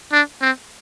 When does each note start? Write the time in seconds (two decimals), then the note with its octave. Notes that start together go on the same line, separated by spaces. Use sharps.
0.12 D4
0.41 C4